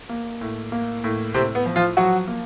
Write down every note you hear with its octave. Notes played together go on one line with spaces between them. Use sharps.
A#3
A2
A#3
A2
A2 C3 C4
B3
F3
F3 F4
F3 F#3 F#4
A#3